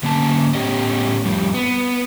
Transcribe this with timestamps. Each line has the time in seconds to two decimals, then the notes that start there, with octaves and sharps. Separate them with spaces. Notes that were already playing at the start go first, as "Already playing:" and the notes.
0.03 D3 A#3 C#4 A5
0.55 A2 B3 C#4 G4 D#5
1.25 F2 G3
1.54 B3